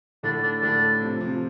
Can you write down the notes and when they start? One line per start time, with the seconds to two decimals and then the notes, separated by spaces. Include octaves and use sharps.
0.23 A2 D3 D4
0.43 D4
0.62 A2 D3 D4
1.01 C3 F3
1.20 C3 F3